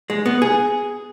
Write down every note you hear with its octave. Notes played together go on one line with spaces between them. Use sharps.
G#3
B3
G#4